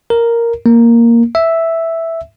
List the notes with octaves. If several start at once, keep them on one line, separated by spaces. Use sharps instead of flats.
A#4
A#3
E5